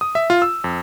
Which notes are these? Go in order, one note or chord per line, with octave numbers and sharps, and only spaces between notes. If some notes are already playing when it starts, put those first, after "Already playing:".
D#6
E5
F4
E6
F2